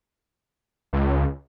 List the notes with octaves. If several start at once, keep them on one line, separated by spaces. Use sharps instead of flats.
C#2